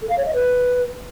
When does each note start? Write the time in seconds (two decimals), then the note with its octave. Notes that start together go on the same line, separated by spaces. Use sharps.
0.01 A4
0.09 F5
0.17 C#5
0.25 D#5
0.33 B4